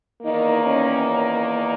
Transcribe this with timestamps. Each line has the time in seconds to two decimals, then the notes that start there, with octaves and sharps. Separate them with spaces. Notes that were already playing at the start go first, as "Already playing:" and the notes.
0.22 E2 D#3 A#3 D#4
0.64 C#4